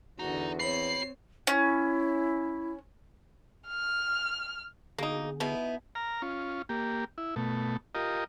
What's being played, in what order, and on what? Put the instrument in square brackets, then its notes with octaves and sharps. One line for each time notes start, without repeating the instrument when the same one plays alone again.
[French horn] E2 [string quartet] D3 F#4 [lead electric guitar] D#4
[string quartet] C4 C#5 [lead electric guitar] F#4 B5 [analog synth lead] C7
[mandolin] C#4 [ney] E4
[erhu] F6
[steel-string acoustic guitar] B2 [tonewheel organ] D3 G#4 [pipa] A#3 D#4
[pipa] B2 [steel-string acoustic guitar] B3 D#4 E4
[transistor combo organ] A#5 F6
C#4 F4
A#3 G4
E4
B2 A3
F4 G4 A#4 D#5